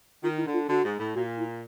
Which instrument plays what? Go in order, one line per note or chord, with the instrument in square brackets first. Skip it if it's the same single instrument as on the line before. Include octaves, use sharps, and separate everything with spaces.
[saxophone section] D#3 [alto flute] F4
[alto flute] E4
[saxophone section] D3
[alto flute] F4
[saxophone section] D3 [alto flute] F#4
[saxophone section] G#2
A2
[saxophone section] A#2 [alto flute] F#4
[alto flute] E4